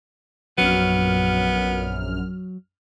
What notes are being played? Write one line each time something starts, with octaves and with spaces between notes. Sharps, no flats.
A#1 F#2 F#3 B3 F6